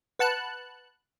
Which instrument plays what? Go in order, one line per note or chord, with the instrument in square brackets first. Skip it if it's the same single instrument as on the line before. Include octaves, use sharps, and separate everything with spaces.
[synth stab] B4 F#5 A5 F#6